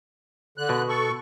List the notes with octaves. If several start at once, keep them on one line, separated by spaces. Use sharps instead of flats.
D3 F#6
B2
A4 C#6